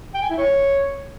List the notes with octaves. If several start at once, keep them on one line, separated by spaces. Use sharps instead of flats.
G5
G#5
E4
C#5